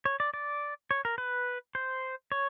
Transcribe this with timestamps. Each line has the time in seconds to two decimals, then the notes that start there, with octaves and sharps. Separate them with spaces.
0.05 C#5
0.20 D5
0.34 D5
0.91 C#5
1.05 A#4
1.18 B4
1.75 C5
2.32 C#5